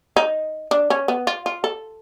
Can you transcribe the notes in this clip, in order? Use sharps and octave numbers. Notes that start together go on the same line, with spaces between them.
D#4
D4
C#4
B3
F4
F4
A4